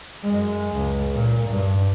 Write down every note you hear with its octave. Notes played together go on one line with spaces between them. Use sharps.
F#2 G#3
C#2
A#2
G2